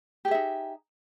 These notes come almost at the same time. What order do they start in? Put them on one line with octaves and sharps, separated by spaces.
G4 G#4 E5 D#4